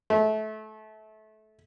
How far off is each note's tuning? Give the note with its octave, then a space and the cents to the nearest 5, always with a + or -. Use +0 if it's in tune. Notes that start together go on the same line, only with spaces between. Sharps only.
A3 -25